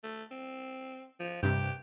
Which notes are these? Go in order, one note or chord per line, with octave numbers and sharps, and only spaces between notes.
A3
C4
F3
G2 C3 G4